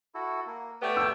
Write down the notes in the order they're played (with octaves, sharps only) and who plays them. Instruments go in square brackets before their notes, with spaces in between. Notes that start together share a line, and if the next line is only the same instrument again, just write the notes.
[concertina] E4 F#4 A4
A#3
[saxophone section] A3 B3 G4 [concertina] C#5 D5 G5
[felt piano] E6 G6